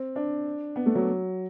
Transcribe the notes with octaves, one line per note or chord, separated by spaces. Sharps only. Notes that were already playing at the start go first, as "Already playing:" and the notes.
Already playing: C4
D4
B3
A3
F#3